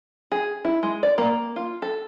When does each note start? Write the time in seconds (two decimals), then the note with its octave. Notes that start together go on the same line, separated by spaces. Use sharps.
0.32 G#4
0.65 E4
0.83 G#3
1.03 D5
1.18 A#3
1.56 F4
1.82 A4